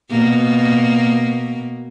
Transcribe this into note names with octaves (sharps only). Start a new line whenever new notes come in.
B2 A#3